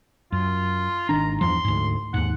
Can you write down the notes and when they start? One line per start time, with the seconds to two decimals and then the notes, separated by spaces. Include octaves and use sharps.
0.32 F#2 F4
1.09 G#1 D#3 D4 A#5
1.41 E2 G2 F3 C6
1.65 D2 G#2
2.14 D#2 G#2 F#5